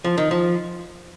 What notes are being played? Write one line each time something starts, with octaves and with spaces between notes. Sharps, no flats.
F3
D#3
F3